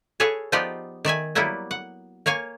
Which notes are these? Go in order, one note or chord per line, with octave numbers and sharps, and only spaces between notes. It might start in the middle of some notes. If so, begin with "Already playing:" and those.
G#4 A4 B4 C#5 F5
F3 B3 D#4 F4 G4 D5
D#3 D5 E5 G#5
F#3 G3 A#3 B3 E4
F#5
A#3 C#5 F5 G#5